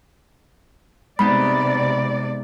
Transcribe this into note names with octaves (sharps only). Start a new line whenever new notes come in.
C3 G#3 B3 D#4 D5 B5